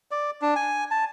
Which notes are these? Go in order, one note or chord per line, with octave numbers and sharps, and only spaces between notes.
D5
D4
G#5
A5